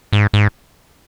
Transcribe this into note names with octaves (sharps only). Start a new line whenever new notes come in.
G#2
G#2